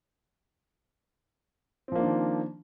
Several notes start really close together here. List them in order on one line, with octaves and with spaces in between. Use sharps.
C4 F3 A#3 D4 D#3